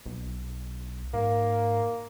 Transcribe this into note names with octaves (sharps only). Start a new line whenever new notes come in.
B1
G#2 A#3